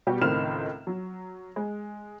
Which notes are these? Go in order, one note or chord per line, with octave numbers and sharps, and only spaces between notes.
B2 G3 F#4 G4
C#2 A2 D#3 C4 F6 E7
F#3
G#3